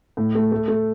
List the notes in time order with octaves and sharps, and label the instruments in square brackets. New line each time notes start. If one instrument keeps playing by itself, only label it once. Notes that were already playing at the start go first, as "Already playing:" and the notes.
[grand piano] A2
A3
A3
A3